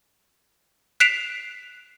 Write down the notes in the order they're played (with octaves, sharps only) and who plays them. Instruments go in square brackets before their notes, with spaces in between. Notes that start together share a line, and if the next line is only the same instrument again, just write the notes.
[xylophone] F#6 B6 C7 D7 E7 F7